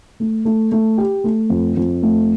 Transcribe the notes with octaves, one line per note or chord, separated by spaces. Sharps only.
A3
A3
A3
G4
A3
F2
F2
A3